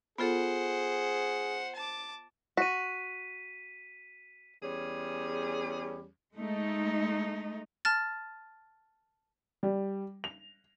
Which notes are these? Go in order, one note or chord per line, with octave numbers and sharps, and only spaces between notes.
B3 F4 G#4 A4 C5 F#5
A5 D6
F#4 B6 D#7
E2 G3 C#4 G#4
G#3 A3 D#4
A5 F6 A6
G3
F7